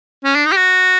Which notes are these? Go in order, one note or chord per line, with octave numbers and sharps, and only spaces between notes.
C#4
D4
D#4
G4
F#4